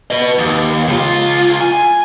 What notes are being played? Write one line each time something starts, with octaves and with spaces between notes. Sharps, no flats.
B4 D#5
D#2
C#2 F4
G#5